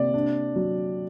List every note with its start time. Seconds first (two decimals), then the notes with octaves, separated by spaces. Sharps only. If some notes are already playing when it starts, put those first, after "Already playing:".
Already playing: C3 A#3 D5
0.14 D4
0.56 F#3